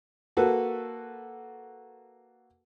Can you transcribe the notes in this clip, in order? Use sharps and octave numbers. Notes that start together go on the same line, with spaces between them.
A#3 F#4 A4 B4